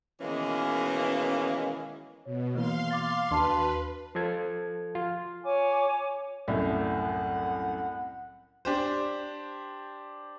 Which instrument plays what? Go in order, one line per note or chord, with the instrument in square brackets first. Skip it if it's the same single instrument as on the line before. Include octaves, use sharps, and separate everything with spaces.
[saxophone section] B2 D#3 E3 G#3 A#3 C#4
[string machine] B2 [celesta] C#5
[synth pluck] E3 A#3 B3 [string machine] F5 C6
[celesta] D6 A6
[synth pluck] D#2 D4 [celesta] F#4 A5 C6 [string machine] B4
[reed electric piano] F3 A4 G#6
F4
[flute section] C#5 G#5 D6
[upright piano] C2 F#2 A2 [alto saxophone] F#5
[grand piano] D4 G4 C5